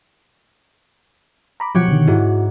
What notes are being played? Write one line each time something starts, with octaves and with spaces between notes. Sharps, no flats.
A#5 B5 D6
B2 F3 F#3 G4 C#5 F#5
B2 D3 D#3
G#2 E4 F#4